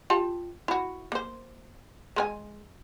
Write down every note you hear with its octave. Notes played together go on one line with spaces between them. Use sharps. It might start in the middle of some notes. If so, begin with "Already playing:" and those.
F4 G4 A5
E4 F#4
A#3 C5
G#3 A#4 G#5